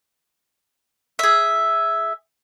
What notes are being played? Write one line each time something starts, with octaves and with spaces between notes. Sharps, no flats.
G#4 E5